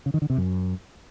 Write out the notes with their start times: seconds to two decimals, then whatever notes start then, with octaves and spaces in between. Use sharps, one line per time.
0.06 C#3
0.14 D#3
0.22 D3
0.30 C3
0.38 F#2